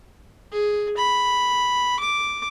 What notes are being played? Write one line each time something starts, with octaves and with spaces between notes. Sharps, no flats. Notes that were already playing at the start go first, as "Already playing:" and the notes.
G#4
B5
D6